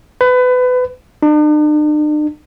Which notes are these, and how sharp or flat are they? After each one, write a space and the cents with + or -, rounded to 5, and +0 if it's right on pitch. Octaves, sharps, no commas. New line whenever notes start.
B4 +25
D4 +45